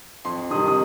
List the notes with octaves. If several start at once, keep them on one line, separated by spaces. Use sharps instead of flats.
F2 C6
C3 D#3 G3 D#6
D#6